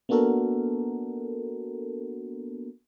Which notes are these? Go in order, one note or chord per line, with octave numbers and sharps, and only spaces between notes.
A#3 B3 D4 F#4 A4 A#4